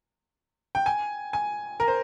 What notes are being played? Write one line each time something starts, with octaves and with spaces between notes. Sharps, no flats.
G5
G#5
G#5
A#4
C5